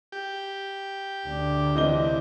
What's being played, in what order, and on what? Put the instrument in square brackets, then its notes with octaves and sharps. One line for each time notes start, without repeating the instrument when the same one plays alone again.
[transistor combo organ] G4
[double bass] D2 D4
[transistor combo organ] C3 [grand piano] E3 D#5 G7